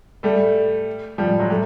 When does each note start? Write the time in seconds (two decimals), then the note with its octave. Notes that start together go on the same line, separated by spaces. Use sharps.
0.23 G3 A3
1.18 F3 G3
1.39 F#3 G#3
1.50 G3 A3